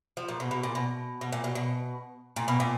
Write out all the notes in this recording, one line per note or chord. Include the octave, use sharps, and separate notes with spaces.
F3
A#2
B2
B2
A#2
B2
B2
A#2
B2
B2
A#2
B2
A#2